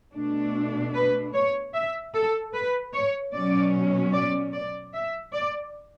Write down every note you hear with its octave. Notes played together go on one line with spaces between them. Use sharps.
B2 A3 D4
B4
C#5
E5
A4
B4
C#5
B2 F#3 C#4 D5
D5
D5
E5
D5